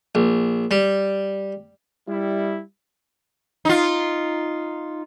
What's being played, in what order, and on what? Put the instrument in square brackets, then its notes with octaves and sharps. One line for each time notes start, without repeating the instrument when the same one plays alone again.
[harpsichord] A#1
G3
[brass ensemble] G3 E4
[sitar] D#4 F4